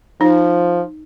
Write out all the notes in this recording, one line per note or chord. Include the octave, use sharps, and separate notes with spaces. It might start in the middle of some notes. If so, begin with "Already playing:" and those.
F3 D#4